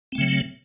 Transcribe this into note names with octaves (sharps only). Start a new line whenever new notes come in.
C#3 F#3 A3 C4